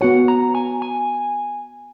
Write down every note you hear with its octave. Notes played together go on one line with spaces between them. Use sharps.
B3 F#4 C#5 F#5
A#5
G#5
G#5